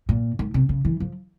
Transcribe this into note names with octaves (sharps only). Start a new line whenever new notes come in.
A#2
G#2
C3
C#3
E3
F3